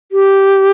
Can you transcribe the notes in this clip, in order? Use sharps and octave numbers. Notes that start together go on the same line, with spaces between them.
G4